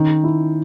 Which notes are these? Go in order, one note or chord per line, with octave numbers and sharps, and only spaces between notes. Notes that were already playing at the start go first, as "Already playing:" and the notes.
Already playing: D#3 C#4
E4